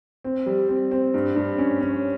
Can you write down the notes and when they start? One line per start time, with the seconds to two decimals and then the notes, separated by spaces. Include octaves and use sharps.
0.24 C4
0.46 G3
0.69 C4
0.91 C4
1.14 G2
1.36 G2
1.58 C#4
1.81 C#4